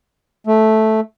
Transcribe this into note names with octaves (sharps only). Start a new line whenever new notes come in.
A3